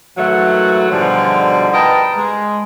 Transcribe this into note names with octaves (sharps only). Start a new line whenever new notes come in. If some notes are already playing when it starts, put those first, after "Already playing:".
G#2 D#3 E3 F#3 A3 F#5
G#2 B2 D3 F3 G3 G#3
A#4 B4 D#5 G5 A5 A#5
G#3